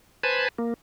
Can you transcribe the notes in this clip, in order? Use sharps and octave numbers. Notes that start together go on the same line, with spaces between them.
B4 C5 G#5 A5 B5
A#3